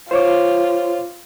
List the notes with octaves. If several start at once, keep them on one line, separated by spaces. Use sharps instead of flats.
F4 C5 C#5 D6